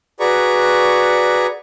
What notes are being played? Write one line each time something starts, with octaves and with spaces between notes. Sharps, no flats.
F#4 G#4 B4 D5 A#5 C#6